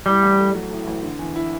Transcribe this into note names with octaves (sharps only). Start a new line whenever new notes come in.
A2 G3
A1
A3
F#3
A2
A1
D3
E2
E4